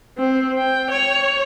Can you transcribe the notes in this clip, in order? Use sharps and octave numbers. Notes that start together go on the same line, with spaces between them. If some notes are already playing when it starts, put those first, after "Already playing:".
C4
G5
C#5